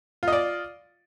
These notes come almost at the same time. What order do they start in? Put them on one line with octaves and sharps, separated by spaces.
F4 D#5 D5